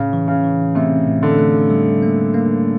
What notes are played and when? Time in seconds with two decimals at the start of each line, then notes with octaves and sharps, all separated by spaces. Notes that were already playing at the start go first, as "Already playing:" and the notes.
Already playing: A2 C#3
0.13 E3
0.28 C#3
0.44 E3
0.75 C3 A3
1.08 A2
1.23 D3
1.38 A3
1.70 G3
2.02 A#3
2.34 A#3